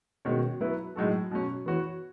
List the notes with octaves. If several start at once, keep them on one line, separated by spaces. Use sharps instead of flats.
B2 D#3 G#3 C#4 F#4 C#5
F#3 B3 E4 B4
A2 F#3 G#3 D#4 F#4 A4
B2 F#3 C#4
E3 B3 F#4 C#5